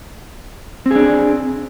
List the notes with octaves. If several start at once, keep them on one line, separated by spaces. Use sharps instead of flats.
C4 D4 G#4